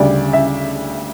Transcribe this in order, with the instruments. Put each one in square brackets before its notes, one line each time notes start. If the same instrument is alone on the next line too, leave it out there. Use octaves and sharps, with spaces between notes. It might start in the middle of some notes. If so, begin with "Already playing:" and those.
Already playing: [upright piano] D2 C#3 G3 D5
E5